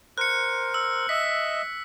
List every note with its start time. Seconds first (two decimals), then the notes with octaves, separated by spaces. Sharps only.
0.18 A#4 C5 F#6 C#7
0.74 E6
1.09 D#5 E5 B6